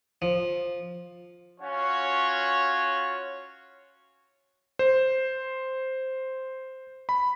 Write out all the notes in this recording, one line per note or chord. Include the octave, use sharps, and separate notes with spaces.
F3
C#4 F4 F#4 C#5
C5
B5